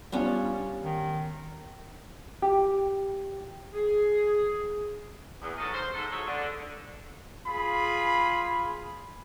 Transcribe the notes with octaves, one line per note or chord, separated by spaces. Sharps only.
G3 B3 C#4 D4 F4
D#3
G4
G#4
E2
G#2 F#3 A4 A#4 C#5 D#5
C5
G#2 A4
F#3 A3 G#4 A4 C#5
D3
F4 G#4 B5